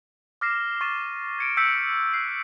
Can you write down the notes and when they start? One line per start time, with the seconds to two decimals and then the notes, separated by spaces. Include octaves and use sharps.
0.41 D6 F6 A#6 C7 E7
0.81 C#6 A6 D#7 E7
1.39 G#6 C#7 D7
1.57 E6 G6 B6 C#7 D7
2.14 F#6 C7